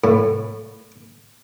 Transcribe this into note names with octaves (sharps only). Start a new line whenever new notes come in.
A2